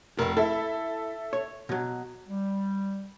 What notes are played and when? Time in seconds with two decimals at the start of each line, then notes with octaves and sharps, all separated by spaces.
0.19 F1 A3 A#4
0.37 E4 A4 E5
1.33 C#5
1.69 B2 F#3
2.26 G3